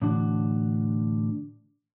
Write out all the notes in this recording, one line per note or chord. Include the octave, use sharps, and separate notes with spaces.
A2 D3 E3 D4 F#4